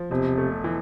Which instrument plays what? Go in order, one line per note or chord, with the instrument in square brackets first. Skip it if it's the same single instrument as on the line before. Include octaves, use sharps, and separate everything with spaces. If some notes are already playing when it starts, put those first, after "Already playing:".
Already playing: [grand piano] F3
[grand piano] E1 [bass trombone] C3
[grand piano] A3
E3